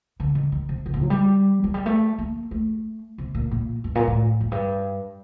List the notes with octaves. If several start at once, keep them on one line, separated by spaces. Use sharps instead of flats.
D3
D#3
D#3
C3
C3
A#2
F#3
G3
F#3
G3
A3
A#3
A3
C3
A#2
A#2
G2
A#2
A2
F#2
G2